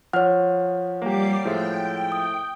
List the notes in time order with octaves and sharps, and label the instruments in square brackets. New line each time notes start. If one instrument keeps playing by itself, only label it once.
[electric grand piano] F3 [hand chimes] C#5 F#5 [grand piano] F6
[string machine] G3 D6 C7 [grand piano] A#3 G4
[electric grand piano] A2 C5 E5 [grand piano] F3 G#3 [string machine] G5
[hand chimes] D#6